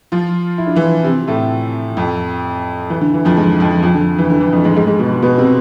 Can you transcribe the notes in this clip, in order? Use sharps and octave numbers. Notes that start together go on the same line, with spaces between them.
F3 F4
E4
D4
E3 E4
C3 C4
A2 A3
F2 F3
E3
D3
E3
F2 F3
G#2 G#3
F2 F3
F2 F3
D3
E3
D3
E3
F2 F3
G#2 G#3
G#2 G#3
G#2 G#3
B2 B3
B2 B3
C3 C4